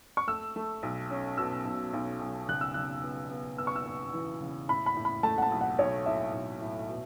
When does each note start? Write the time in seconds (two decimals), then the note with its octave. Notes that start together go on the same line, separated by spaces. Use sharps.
0.17 C#6
0.27 A3 E6
0.56 A3
0.83 B1
1.10 C#4
1.38 B2 E6
1.65 B1
1.93 B1
2.21 B1
2.48 C#3 F#6
2.61 E6
2.74 C#3 F#6
3.04 B3
3.31 B3
3.58 B3 E6
3.67 C#6
3.76 E6
3.86 B3
4.13 E3
4.41 C#3
4.69 A2 B5
4.86 B5
4.97 A2
5.05 B5
5.23 A3 A5
5.38 F#5
5.42 A5
5.51 B1
5.61 F#5
5.79 B1 C#5
6.06 A2 E5
6.33 B1
6.62 A2
6.89 B2